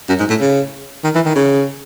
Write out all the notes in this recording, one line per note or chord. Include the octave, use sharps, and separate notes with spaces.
F#2
G#2
A2
C#3
D#3
E3
D#3
C#3